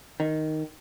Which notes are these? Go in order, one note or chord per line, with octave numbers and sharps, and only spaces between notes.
D#3